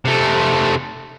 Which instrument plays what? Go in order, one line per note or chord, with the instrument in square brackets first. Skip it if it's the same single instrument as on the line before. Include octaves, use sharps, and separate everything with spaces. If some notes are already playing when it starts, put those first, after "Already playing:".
[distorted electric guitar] C3 A3